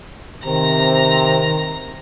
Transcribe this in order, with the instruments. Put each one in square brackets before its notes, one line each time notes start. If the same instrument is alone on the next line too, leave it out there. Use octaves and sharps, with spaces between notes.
[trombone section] C3 C4 [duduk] D#3 [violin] A#5